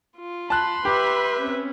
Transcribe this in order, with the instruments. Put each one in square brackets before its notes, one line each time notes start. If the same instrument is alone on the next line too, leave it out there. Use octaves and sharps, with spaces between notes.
[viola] F4
[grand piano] A5 F#6 [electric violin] B5 C6
[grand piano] G4 [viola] B4 E5
[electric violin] C4 C#4